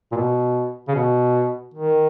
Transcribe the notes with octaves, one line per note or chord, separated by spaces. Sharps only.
A#2
B2
C#3
B2
D#3